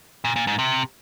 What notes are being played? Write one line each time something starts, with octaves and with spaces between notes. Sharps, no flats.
A#2
A#2
G#2
C3